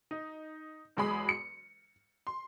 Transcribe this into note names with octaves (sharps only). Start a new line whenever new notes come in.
D#4
E2 F#3 G#3 G#4 B5 D#6
C#7
C6